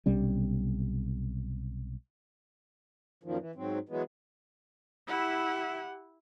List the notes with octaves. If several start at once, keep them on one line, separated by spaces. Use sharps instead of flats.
B1 C3 G3 C#4
F#2 A#2 D#3 F3
E3
G#2 F#3 C4
E3 F#3 G#3 B3
E4 G4 F#5